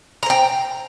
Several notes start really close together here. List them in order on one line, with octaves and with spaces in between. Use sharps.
A#5 C5 G5